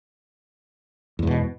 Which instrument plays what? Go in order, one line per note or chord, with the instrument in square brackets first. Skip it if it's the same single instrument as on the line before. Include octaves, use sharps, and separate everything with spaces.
[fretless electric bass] E2
G#2
B2